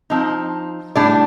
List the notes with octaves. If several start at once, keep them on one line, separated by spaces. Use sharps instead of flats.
F3 C4 D#4
A2 G3 D4 D5